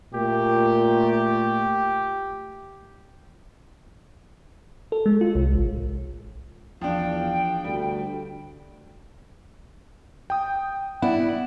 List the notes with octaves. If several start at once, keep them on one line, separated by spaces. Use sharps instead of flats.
A#2 A3 G4
A4
G#3
F4
C2
A1
E2 F3 D4 F5 G5
D2 G3
G5 D#6
B3 E4 D5 F#5